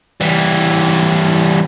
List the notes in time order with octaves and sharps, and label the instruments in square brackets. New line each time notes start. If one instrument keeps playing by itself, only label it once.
[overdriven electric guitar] E3 G3